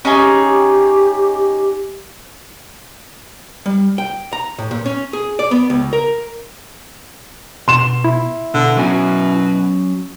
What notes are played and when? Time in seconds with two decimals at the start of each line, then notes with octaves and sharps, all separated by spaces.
0.05 C#4 D#4 G4 G#4
3.66 G3
3.98 G5
4.33 A#5
4.58 A2
4.71 A#2
4.86 C#4
5.13 G#4
5.39 D5
5.51 B3
5.70 C#2
5.93 A#4
7.68 B2 C6 E7
8.04 E4
8.54 B2 D3
8.77 B2 F#3 C#4 G#5